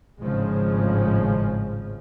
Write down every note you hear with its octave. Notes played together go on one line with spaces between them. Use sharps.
G#1 A2 C#3 F3 G#3